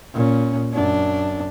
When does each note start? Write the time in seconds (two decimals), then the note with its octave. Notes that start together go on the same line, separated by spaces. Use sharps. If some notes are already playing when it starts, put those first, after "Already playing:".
0.14 A#2 C#4
0.74 F#2 D4